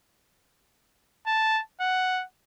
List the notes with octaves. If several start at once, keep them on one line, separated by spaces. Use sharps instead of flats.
A5
F#5